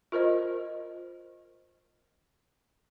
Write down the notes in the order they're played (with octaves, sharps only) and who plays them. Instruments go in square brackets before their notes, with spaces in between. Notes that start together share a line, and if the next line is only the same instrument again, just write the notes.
[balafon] F4 A#4 C5 D#5